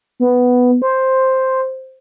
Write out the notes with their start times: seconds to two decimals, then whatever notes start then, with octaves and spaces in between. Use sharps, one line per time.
0.20 B3
0.82 C5